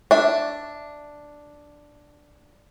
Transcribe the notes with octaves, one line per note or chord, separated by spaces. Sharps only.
D4 E5